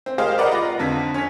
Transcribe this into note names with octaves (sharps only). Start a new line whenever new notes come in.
C4
G4 G#4 A#4 C5 D#5 F5
A#4 B4 D5 D#5 F#5 A#5
F4 A#6
F2 D3 B6
C#4 B6